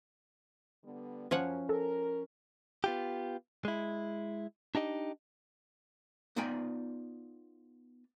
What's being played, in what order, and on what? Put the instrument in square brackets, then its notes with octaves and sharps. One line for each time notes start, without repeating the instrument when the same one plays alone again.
[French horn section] D3 G3 B3
[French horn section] F#2 [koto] F3 C#5 F#5 [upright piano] C#4
[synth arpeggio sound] A4 [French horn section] A#4
[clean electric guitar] B3 F4 G4
G#3 E4
D4 D#4 G4 D#5
[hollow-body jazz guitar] B3 D#4 F4 D5 G5 G#5